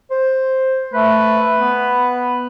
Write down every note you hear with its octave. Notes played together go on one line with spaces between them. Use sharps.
C5
A3 B4
B3